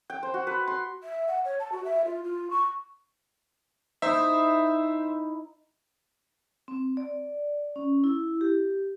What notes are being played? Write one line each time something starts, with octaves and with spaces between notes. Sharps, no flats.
G5
C5
F#4
B4
C6
E5
F#5
C#5
A5
F#4
E5
F4
F4
C#6
D#4 E4 C5 E5
C4
D5
C#4
E4
G4